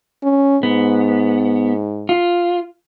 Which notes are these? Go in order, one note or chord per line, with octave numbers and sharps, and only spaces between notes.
C#4
G#2 B3
F4